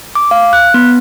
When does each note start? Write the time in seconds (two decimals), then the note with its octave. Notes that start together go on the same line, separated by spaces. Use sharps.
0.15 D6
0.31 F5
0.53 F#6
0.74 B3